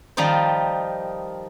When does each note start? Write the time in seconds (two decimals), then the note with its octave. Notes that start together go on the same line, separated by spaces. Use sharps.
0.17 D#3 F3 G3 D#4 C5